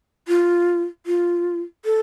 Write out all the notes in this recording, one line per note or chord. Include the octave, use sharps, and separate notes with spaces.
F4
F4
A4